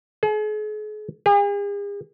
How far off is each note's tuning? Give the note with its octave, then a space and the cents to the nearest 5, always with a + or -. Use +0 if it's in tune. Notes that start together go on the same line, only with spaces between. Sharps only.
G#4 +40
G#4 -45